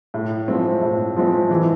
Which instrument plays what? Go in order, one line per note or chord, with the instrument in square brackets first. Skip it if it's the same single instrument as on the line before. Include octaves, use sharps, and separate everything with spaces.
[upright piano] A2
F3 G#3 C4
A2
F3 G#3 C4
E3